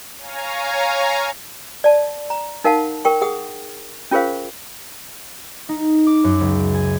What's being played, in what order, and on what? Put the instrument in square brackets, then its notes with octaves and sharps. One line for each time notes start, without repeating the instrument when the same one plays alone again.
[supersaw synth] C#5 F5 G#5 A#5
[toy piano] D5 A5
A#5
D#4 A#4 F5 F#5 A5
A#4 G5 C#6
G#4 F#5 D#6
C#4 F4 G#4 A#4 C5 F5
[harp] D#4
D6
F#2
C#2
G#5